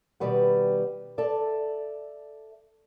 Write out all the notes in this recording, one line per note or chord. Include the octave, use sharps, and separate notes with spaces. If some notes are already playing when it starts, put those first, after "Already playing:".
B2 D#3 G3 B4 F#5
A4 D5 E5